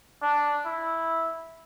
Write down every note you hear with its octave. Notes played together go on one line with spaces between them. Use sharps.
D4
E4